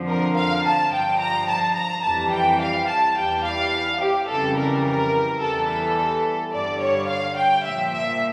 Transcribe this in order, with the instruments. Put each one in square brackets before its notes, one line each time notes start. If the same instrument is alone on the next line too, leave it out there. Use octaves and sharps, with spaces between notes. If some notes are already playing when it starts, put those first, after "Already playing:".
Already playing: [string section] F2 D3 F3
A#4
F5
A5
G2 F3 G5
A#5
A5
A#5
F2 E3 G3 A5
G5
F5
A5
E2 E3 G3 G5
F5
G4
F2 C#3 E3 G3 A4
A#4
A#4
E2 E3 G3 A4
A4
G2 D3 G3 D5
C#5
F5
G5
A#2 F3 E5
E5